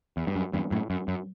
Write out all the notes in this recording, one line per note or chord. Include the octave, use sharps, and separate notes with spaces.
E2
G2
F#2
E2 G2
F#2 A2
F#2
F#2